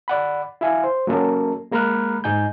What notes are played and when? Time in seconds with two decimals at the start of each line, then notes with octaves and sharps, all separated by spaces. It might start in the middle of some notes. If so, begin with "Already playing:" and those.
0.08 D5 F#5 B5
0.61 E4 E5 F5 G#5
0.84 C5
1.07 F#3 A#3 C#4 A4 A#4
1.72 G#3 A#3 A#5 B5 F6 F#6
2.24 G#2 D#4 G#5 G6